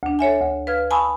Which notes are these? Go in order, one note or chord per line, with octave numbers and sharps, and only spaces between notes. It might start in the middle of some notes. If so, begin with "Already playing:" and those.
D2 D4
A4 C#5 E5 G#5
D2
B4 F5 F6 G#6
G#5 A5 B5 C#6 D#6 E6